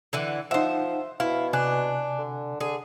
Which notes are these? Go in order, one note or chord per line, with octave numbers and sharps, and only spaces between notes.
D3 E3 F#5
F3 D#4 C5 E5 F#5
B2 E4 F5
C3 D4 G#5 F#6
D3
D3 G#4